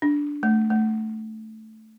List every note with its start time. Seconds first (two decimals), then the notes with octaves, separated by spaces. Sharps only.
0.02 D4
0.43 A3
0.70 A3